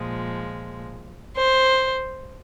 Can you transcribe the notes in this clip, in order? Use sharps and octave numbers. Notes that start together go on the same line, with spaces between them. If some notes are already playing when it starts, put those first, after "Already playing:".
Already playing: A#2 F3 G#3
C5